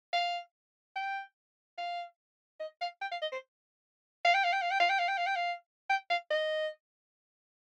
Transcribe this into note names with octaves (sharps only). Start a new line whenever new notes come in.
F5
G5
F5
D#5
F5
G5
F5
D#5
C5
F5
G5
F5
G5
F5
G5
F5
G5
F5
G5
F5
G5
F5
G5
F5
D#5